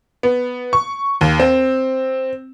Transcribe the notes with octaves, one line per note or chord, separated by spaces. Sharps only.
B3
C#6
D#2
C4